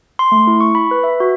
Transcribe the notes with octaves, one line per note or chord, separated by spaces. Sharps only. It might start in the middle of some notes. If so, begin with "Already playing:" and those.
C6
A3
E4
C#6
B5
B4
E5
F#4